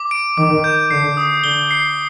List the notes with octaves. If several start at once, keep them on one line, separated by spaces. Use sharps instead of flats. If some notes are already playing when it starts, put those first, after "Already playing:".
Already playing: D6
D7
D#3 D6
G6
D3 C7
D#6
D3 G7
C7